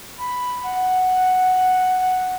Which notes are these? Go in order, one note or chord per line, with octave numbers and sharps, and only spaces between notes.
B5
F#5